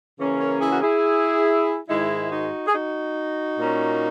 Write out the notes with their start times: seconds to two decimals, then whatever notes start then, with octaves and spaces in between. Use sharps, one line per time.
0.19 C#3 E3 A#3 C#4
0.39 A#4 C#5
0.61 E4 G#4
0.73 F#4
0.82 E4 G#4
1.88 G#2 D#3 G#3 D#4 E4
2.30 D#4 F#4
2.67 G#4
2.73 D#4 F#4
3.58 A#2 A#3 C#4